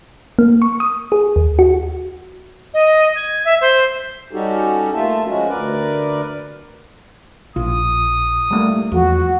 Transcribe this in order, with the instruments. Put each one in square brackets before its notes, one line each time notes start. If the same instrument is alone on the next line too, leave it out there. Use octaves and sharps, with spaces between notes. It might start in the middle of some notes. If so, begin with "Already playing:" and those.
[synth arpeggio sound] A#3
C#6
D#6
G#4
D#2
F#4
[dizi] D#5
G#6
E5
C5
[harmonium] G3 C#4 D#4 F#4 G4 A4
A3 A#3 F4 E5 A5
F3 G#3 C#4 F#4
D2 A#4 B4 D5
[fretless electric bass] A#1 [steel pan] F4 [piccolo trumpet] D#6
[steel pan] G3 A3 A#3
[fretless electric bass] E2 [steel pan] F3 [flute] F#4